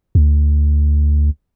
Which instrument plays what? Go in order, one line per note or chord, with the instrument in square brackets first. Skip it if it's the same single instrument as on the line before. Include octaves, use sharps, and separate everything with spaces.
[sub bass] D2